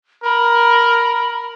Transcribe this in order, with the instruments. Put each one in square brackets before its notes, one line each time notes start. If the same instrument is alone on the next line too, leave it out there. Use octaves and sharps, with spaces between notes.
[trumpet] A#4 [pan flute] B5